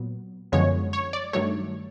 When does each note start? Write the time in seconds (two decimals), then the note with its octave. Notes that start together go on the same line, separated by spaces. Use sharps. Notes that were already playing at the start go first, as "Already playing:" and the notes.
Already playing: A#2 F#3 B3
0.52 F#2 D3 F3 G#3 B3 C#5
0.93 C#5
1.13 D5
1.33 G2 D#3 F#3 A3 C#5